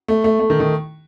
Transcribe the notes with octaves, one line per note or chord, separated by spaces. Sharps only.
A3
A3
A3
D#3
D#3